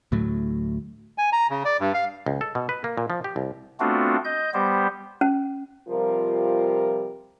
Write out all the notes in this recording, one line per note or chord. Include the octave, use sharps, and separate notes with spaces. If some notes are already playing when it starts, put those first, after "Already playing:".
D2 A2 F#3 A3
G#5
A#5
C#3
D5
G2
F5
C#2
A4
B2
B4
A#3
A#2
F3
G4
C2
A3 B3 C4 D4 F4 F#4
D#5 G6
G3 B3 G4 C5
C#4
C3 F3 G3 F4 A#4